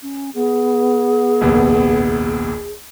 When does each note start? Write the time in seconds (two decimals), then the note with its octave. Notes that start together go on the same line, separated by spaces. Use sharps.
0.02 C#4
0.35 B3 G#4
1.41 F1 A#1 D#2